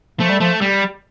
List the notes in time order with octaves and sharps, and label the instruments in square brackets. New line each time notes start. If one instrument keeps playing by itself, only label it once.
[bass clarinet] F3 [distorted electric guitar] A3
[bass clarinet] G3
[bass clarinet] F3 [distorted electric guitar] A3
[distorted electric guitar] G3